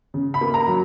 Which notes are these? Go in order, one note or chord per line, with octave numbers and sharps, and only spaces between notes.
C#3
B5
A#3
A#5
F#3